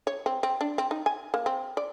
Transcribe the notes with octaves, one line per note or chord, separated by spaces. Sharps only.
C#5
C4
C4
D4
C4
D#4
G#5
A#3
C4
D5